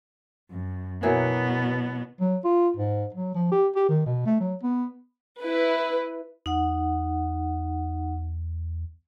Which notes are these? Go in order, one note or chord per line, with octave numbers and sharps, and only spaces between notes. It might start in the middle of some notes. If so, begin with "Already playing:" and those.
F#2
B2 E3 F#3 A#3 B3
F#3
F4
G#2
F#3
F3
G4
G4
D#3
B2
A3
F#3
B3
E4 B4
E2 D#4 F#5